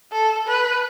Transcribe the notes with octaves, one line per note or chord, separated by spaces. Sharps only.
A4
B4